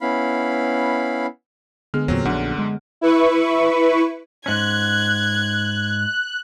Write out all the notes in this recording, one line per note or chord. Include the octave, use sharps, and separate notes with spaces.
B3 C#4 E4 F5 B5
D3 G#3 B3 G#4 F6
E2 A#2 F#3 C4
A#1 F#2 D3 F#3 D4 F#5
G#3
E4 B4 C#6
G#2 C#4 F#6 G#6